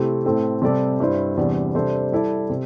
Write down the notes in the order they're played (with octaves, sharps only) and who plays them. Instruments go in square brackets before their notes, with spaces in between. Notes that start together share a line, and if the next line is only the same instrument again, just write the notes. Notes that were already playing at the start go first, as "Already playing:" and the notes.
Already playing: [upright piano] C3 A3 C4 E4 G4
A2 A3 C4 A4
C3 G3 C4 A4 D5
G2 G3 E4 C5
E2 C3 G3 D4
C3 G3 D4 A4 C5
G3 E4 A4 D5
C3